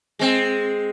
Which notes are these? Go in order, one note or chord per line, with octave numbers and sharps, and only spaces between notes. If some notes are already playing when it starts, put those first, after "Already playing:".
G#3 C4